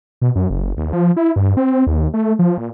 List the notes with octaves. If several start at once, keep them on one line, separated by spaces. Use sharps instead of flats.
B2
F#2
F#1
D#2
F3
E4
G2
C4
D#2
A3
F3
A#2